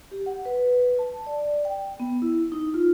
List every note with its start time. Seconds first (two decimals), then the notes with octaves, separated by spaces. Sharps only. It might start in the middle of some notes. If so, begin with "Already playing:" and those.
0.11 G4
0.26 F#5
0.45 B4
0.99 A5
1.27 D5
1.65 G5
2.00 B3
2.22 E4
2.52 D#4
2.74 F4